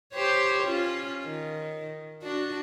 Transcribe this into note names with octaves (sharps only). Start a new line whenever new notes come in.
G4 C5 C#5
C#4 F4
D#3
D4 F#4